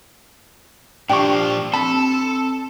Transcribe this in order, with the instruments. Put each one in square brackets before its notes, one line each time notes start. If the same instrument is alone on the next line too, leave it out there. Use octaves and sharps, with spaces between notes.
[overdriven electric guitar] A#2 F3 [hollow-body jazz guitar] D4 G4 [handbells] G5 C#6
[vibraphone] C4 [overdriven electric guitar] A4 [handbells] A5 [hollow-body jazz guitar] B5